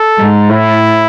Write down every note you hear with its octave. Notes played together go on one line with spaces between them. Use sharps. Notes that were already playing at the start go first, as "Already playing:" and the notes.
Already playing: A4
G#2
A2 E4